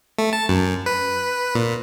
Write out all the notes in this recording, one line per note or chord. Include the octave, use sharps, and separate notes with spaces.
A3
A5
F#2
B4
A#2